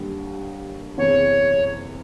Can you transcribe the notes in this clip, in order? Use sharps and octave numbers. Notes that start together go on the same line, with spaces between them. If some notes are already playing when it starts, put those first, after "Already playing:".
Already playing: D#2 D3 G3
F#1 E2 C3 E3 C#5